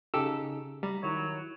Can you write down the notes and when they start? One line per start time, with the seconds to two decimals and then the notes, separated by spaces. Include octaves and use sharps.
0.14 C#3 D#4 G4 A4 E6
0.83 G3 A#5
1.03 D#3 F#3 E4 C#5